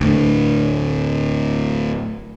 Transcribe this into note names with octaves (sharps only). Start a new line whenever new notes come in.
D2 A2